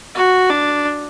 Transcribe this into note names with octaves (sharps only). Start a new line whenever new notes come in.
F#4
D4